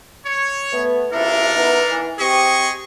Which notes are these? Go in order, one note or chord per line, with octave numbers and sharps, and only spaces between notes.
C#5
A3 B3
C#2 C3 D4 E4 A4 A#4
B3 D#4 E4
E3
C4 G4 G#4 D#5 C#6